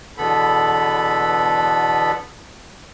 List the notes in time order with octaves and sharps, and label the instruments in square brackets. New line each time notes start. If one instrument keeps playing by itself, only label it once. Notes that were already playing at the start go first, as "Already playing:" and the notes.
[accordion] E2 B2 D3 B3 A4 B5